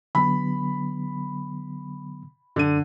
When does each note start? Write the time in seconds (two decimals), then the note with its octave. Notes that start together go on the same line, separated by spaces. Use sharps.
0.15 D3 F#3 B3 B5
2.56 F#2 D3 D#7